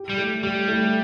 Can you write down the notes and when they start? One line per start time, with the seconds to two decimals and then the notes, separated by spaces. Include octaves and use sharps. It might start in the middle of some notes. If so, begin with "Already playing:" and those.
Already playing: G4
0.09 G3
0.17 A3
0.43 G3 G4
0.68 A3